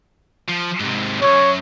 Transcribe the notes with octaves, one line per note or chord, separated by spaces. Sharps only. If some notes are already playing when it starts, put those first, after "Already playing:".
F3
G#2 C3
C2 F#2 C#5